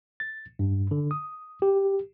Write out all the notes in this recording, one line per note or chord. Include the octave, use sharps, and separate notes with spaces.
A6
G2
D3
D#6
G4